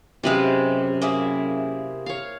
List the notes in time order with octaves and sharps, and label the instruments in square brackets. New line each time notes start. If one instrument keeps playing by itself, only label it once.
[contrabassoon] F#2 [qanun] C3 B4 F5 [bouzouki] G#3 E4 G4
[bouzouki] A#3 E4 G#4
[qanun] C#5 F5